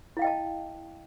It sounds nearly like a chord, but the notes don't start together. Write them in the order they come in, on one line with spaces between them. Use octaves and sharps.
E4 F5 G5 D#5 A5